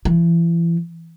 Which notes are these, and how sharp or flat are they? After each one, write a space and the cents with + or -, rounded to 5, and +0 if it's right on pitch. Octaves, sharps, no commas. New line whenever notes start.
E3 +35